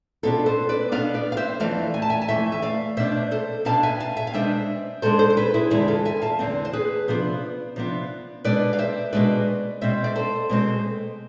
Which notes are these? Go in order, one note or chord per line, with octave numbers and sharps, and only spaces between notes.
B2 B3 D4 F4 A4
A4 C5
B4 D5
B2 B3 D4 D5 F5
B4 D5
F5
C5 E5
F2 E3 A3 D5 F5
G#5
A5
E5 G#5
A5
F2 E3 A3 E5 G#5
E5
D5 F5
B2 B3 D4 C5 E5
A4 C5
B2 B3 D4 F5 A5
E5 G#5
F5 A5
E5 G#5
F5
B2 G#3 D4 C5 E5
B2 G#3 D4 A4 C5
A4 C5
C5
G#4 B4
E4 G#4
E2 D3 G#3 C4 E4 G#4
F4 A4
E5 G#5
F5 A5
E2 D3 G#3 C4
C5
G#4 B4
C3 F3 B3 D4
C3 F3 B3 D4
B2 G#3 D4 B4 D5
F5
C5 E5
B2 G#3 D4 B4 D5
B2 G#3 C4 C5 E5
D5
A4 C5
B2 G#3 C4